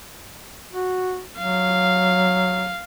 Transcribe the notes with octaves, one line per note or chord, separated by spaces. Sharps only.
F#4
F#3 F5